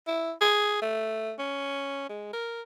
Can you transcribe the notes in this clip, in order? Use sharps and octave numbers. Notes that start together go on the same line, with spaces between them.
E4
G#4
A3
C#4
G#3
A#4